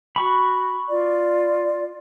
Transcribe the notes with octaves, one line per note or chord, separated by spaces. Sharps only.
F#4 B5 C#6
F4 D5